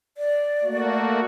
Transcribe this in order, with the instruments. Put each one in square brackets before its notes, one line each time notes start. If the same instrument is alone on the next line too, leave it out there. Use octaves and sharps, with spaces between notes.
[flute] D5
[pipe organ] A3 A#3 F#4